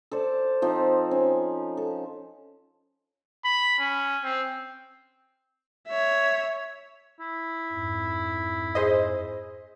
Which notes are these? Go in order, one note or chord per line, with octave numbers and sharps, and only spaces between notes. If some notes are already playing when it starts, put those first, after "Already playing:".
A4 C5 D5
F3 C4 D#4
C#4
A4
B5
C#4
C4
C#5 E5
E4
F2 G#2
G#4 C5 D#5